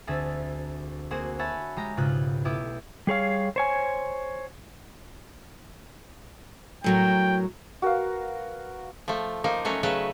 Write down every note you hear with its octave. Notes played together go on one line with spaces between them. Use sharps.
D2 C4 G#4 E5 A5 B6
A#3 C4 F#4 G#4 C5 F#5
C#5 E5 F#5 G#5 A5 B5
G#3 G4 A#5
B1 G#2 C#3 F4 G4 F#6
A3 B3 E4 G4 D6
G3 G#4 C#5 F5
C5 C#5 G#5
A2 F#3 A#4 G5
F#4 A#4 B4 F5
F3 A3
F3 A#3 D#4
F#3 A3 C#4
C#3 F#3 A3 B4 A5